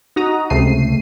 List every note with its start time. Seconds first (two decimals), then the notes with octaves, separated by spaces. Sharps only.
0.16 D#4 F#4 A#5 D#6
0.50 C#2 C3 A3 C7 D#7